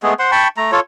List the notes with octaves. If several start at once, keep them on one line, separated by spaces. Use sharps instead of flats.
G#3 A3 B3 G#4
C5 F#5 C6
G5 A5 B5 C#6
A3 A#5
F4 A4 C#5